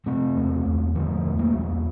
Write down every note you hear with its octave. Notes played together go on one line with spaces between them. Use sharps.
C3 A3 C4
E2
E2
D3 F3 A3
E2
G3 A#3
E2